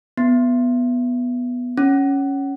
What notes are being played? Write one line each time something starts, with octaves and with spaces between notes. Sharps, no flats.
B3
C#4